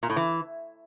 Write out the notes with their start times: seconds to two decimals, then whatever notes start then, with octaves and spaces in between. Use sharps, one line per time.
0.03 A#2
0.10 A2
0.16 E3